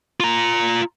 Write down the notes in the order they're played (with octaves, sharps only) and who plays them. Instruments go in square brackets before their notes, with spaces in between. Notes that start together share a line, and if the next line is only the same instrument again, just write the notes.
[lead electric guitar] F4 A#5